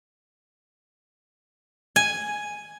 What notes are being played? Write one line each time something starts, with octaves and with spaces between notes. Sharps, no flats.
G#5